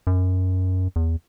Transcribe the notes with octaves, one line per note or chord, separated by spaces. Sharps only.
F#2
E2